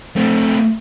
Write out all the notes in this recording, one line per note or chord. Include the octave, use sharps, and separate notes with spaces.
A3 C4